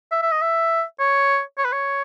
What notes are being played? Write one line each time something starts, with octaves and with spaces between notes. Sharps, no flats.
E5
E5
D#5
E5
C#5
C#5
B4
C#5